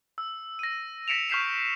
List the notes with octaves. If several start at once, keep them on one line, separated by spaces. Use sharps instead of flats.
E6
A#6 D#7
A#6 B6 C#7 D7 E7 F7
C#6 F6 G6 B6 C7 E7